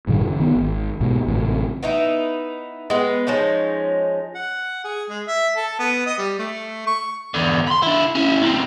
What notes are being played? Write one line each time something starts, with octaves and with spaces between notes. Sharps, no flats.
A1 G2 A#2 D#3
F#1
D#3 B3
G#1
B1 G#2 B2
A1 A2 C3
B3 D#4 E4
G#3 B3
F3 G#3 C#4 D#4
F#5
G#4
G#3
E5
A4
B3
D#5
G3
A3
C#6
E2 D3
B5 C6
D4 E4
C#4 E4
D2 C4